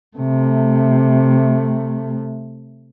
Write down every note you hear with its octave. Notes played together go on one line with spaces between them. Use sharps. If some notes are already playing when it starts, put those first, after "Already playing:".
C3 A3